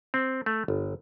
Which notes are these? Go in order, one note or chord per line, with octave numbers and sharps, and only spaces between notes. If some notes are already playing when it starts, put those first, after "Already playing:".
C4
A3
G1